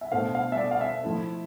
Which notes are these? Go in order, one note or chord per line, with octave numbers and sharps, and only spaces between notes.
E5
B2 A3 D4 A4 C5 F5
F5
E5
D5
F5
E5
F3 A3 E4 A4